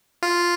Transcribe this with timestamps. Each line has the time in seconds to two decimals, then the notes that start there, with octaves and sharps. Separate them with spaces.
0.23 F4